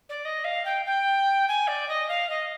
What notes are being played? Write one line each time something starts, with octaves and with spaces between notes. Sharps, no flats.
D5
D#5
F5
G5
G5
G#5
D5
D#5
F5
D#5